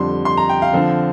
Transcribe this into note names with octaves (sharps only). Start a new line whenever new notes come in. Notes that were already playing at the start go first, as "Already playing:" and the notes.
Already playing: F2 D3 G3 C6
C6
A#5
G5
F5
D3 F3 C4